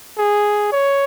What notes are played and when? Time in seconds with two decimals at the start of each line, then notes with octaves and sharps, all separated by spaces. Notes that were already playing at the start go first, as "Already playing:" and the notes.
0.18 G#4
0.72 C#5